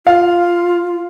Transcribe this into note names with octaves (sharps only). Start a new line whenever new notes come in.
F4 F5